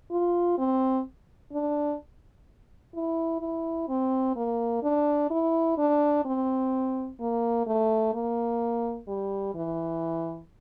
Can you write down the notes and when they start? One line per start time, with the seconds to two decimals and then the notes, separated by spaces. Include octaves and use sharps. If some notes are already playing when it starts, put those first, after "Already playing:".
0.11 F4
0.58 C4
1.52 D4
2.95 E4
3.41 E4
3.88 C4
4.36 A#3
4.83 D4
5.30 E4
5.78 D4
6.25 C4
7.20 A#3
7.66 A3
8.14 A#3
9.08 G3
9.55 E3